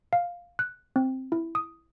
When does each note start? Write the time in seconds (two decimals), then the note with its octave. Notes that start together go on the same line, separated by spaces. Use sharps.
0.13 F5
0.59 F#6
0.96 C4
1.32 E4
1.55 D#6